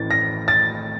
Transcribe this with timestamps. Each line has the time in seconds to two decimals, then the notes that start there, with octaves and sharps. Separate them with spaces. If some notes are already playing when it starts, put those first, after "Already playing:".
Already playing: A1 A2 E3 A6
0.11 A#6
0.48 A6